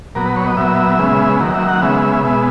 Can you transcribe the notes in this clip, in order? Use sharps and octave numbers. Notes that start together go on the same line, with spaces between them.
A#2 F#3 B3 A#4
B4
C#5
D#5
A#2 F#3 B3 E5
C#3 G#3 B3
D#3 F#3 A#3
E5
F#5
C#3 G#3 B3 E5
E5
B2 G#3 B3 E5